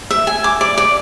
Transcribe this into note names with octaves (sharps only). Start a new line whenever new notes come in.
E5
G#5
D6
D5
D5